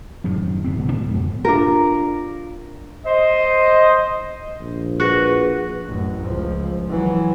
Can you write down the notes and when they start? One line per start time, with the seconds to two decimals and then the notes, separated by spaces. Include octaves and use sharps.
0.24 F#2 A2 C3 D#3
0.65 F#1 G#2 B2 C4
0.78 D1 B2
0.93 G#2
1.14 F2 B2
1.45 D4 F4 A#4
3.06 C5 D#5
4.60 A#1
5.00 F#4 G#4 B4 A#6
5.86 A1 F#2
6.25 C#2 F3
6.90 E3 F#3